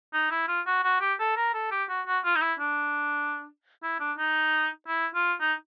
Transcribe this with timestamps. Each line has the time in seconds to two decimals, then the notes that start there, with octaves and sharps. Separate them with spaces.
0.13 D#4
0.31 E4
0.48 F4
0.66 F#4
0.84 F#4
1.01 G4
1.19 A4
1.37 A#4
1.54 A4
1.71 G4
1.89 F#4
2.06 F#4
2.25 F4
2.36 D#4
2.41 E4
2.59 D4
3.83 E4
4.00 D4
4.18 D#4
4.88 E4
5.15 F4
5.41 D#4